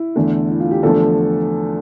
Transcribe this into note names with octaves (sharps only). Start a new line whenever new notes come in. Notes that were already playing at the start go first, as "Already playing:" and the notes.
Already playing: E4
E2 D3 A3
E4
F4
G4
E2 D3 F3 A3 A4